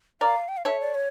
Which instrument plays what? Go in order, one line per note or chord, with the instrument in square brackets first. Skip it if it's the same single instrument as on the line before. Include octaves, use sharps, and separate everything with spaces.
[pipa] A#4 D5 [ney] F5
[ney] G5
F5
[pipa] A4 C#5 [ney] E5
[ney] D5
C#5